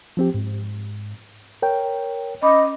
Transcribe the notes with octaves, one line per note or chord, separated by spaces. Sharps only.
F3 C4 G4
G#2
A#4 C#5 G5
C#4 D#5 B5 D6